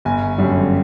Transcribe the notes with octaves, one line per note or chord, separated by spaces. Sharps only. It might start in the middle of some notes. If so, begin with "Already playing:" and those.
G1 G#5
F#2 D3 G3